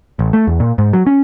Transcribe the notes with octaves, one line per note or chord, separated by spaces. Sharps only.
A1
A3
E2
A#2
G#2
F#3
C#4